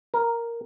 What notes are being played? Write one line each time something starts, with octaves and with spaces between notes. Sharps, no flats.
A#4